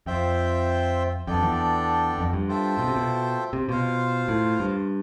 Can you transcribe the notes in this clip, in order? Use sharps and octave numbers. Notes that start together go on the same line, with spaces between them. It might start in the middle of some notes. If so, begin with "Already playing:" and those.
F2 C4 F4 C5 E5 G5
F2 B3 D4 A4 D5 G5
E2
F2
G2
F4 A4 C5 E5 G5
B2
C3
B2
C3
B2 F4 C5 F5
A2
G2